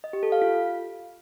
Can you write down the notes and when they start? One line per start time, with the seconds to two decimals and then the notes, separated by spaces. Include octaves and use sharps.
0.04 D#5
0.13 G4
0.23 A4
0.32 F5
0.42 F4